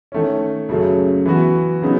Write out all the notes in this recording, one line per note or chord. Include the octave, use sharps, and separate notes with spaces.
D#3 A3 C#4
F#2 C#3 F#3 A3
E3 B3 F#4
C#3 F#3 B3 D#4